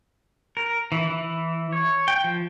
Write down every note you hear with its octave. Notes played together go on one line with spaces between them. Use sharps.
A#4
E3
E3
C#5
G5
F3